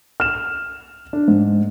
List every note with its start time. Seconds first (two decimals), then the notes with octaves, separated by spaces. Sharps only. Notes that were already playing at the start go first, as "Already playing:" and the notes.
0.20 F6 E7
1.13 D4
1.28 G#2